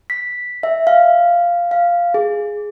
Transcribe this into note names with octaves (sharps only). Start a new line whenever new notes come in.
B6
E5
F5
F5
G#4